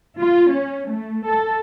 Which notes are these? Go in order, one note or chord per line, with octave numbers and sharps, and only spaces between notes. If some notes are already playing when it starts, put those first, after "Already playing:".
F4
C#4
A3
A4